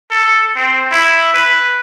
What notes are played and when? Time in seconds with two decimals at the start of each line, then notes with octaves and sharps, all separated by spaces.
0.11 A4
0.55 C4
0.92 E4
1.34 B4